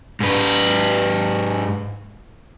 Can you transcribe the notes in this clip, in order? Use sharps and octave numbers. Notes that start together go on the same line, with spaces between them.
G#2 B4